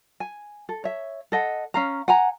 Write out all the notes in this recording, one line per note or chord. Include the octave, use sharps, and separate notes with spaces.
G#5
A4
C#5 E5
A4 D#5 F#5
C#4 F5 A#5
F#5 G#5 A#5